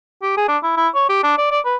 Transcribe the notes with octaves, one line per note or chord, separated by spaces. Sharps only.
G4
G#4
D4
E4
E4
C#5
G4
D4
D5
D5
B4